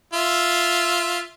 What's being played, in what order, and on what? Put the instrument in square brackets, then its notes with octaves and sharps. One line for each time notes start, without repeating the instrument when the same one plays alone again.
[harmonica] F4 E5